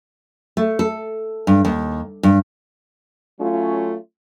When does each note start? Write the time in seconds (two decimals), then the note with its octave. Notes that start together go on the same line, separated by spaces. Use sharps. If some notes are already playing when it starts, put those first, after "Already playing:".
0.57 A3
0.79 A4
1.47 G2
1.65 D#2
2.23 G2
3.40 F#3 A3 C#4 F4